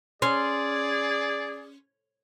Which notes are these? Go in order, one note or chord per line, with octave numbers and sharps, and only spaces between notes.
C#4 G#4 D5 C6